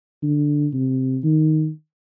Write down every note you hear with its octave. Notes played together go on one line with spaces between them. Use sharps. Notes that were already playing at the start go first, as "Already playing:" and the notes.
D3
C3
D#3